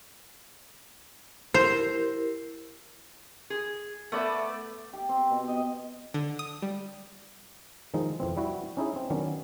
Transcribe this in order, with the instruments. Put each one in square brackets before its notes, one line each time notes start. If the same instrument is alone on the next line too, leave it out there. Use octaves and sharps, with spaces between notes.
[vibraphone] E4 G4 A#4 [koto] C5
[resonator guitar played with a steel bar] G#4
[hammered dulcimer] A3 D5 [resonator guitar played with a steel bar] B3 B4 E5
[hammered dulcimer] G4
C4
B2
D#5
[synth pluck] D3
D#6
G3
[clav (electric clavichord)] D#3 F3 G#3 D#4
F2 E3 C4
G3 E4 F#4
C#4 D#4 E4 G#4
C4
D#3 F#3 B3 C#4 D4